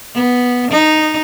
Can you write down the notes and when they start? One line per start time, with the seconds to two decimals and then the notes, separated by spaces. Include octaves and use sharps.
0.15 B3
0.71 D#4